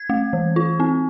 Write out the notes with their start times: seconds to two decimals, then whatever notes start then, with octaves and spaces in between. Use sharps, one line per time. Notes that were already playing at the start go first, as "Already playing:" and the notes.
Already playing: G#6
0.10 A3
0.33 E3
0.56 F4
0.80 C4